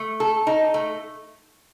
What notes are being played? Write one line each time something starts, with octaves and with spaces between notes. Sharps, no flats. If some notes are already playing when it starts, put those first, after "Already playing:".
Already playing: A3
A4
D#4
A3